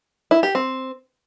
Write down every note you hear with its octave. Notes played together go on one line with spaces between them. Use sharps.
E4
G4
C4